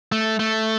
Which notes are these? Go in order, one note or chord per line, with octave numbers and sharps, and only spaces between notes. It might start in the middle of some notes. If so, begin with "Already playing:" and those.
A3
A3